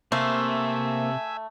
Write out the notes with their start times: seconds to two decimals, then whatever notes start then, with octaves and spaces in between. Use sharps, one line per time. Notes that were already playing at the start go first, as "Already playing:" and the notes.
0.12 C3 A3 A#3 C5 E5 F5 G#5